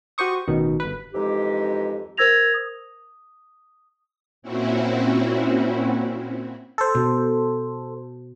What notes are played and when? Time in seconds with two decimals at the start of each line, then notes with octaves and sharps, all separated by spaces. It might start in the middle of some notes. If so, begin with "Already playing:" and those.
0.18 F#4 G4 C5 C#6 D#6
0.48 A1 B2 D#3
0.80 G1 B4
1.13 F2 E3 G#3 D#4 G4
2.17 A#4 C5 E6 G#6 A#6 F7
2.54 D#6
4.42 A#2 C4 C#4 E4 F#4
6.78 A4 C5
6.95 B2